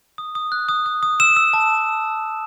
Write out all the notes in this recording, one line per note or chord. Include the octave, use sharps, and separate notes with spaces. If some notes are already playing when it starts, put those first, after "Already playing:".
D#6
D#6
F#6
D#6
D#6
D#6
E6 E7
E6
A5